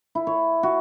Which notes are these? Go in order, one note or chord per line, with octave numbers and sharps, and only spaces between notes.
E4
C#5
F#4